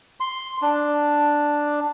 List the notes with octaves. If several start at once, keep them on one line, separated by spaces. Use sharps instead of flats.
C6
D4